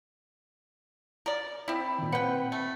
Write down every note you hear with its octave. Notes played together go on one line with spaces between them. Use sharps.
A#4 D5
C4 E4
A#2 D#3
C4 B4 F#5 G5
A3